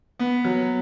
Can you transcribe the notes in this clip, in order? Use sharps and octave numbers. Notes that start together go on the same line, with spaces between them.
B3
F#3